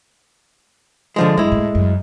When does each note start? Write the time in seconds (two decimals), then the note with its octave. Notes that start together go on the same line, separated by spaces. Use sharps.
1.16 D3 F3 G#3
1.38 F#2 G#3 E4
1.52 A2
1.75 F#2